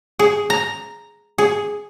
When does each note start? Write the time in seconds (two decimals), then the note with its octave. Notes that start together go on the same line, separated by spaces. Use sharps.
0.19 G#4
0.50 A#5
1.38 G#4